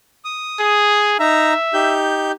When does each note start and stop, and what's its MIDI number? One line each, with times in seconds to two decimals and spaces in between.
0.25 1.10 87
0.59 1.18 68
1.19 1.53 63
1.19 1.97 76
1.19 1.53 82
1.74 2.32 63
1.74 2.32 67
1.74 2.32 91